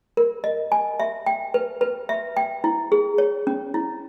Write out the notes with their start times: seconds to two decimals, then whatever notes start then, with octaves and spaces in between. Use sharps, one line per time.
0.17 A#4
0.44 D#5
0.72 G#5
1.00 E5
1.26 G5
1.54 B4
1.81 B4
2.09 E5
2.37 G5
2.64 E4
2.92 G#4
3.18 C#5
3.47 C#4
3.74 E4